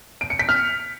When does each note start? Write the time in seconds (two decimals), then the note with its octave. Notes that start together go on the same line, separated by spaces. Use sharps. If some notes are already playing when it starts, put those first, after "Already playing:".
0.21 D7
0.30 C#7
0.39 B6
0.49 F6